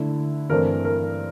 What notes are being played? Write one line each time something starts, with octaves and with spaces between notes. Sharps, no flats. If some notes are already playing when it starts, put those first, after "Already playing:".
Already playing: D3 A3 E4
G2 E3 A3 C4 A#4
A#4